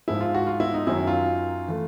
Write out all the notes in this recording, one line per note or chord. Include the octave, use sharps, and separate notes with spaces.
G#2 F3 G#3 E4
F4
F#4
F4
E4
D#4
F#2 D#3 F#3 E4
F4
E3 A3